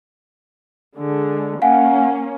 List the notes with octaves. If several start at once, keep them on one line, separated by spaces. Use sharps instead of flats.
D3 G#3
A#3 C#4 F5 F#5 G#5